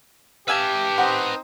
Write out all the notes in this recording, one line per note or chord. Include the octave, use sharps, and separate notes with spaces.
G4 B4 E5 F5 G#5 A5
C4 D#4 C5 F#5